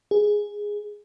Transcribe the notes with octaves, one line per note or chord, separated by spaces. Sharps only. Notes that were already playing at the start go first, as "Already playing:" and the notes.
G#4